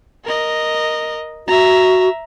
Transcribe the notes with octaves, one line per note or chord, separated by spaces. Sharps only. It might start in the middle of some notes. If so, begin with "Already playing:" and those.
A#4 D#5
F#4 E5 A#5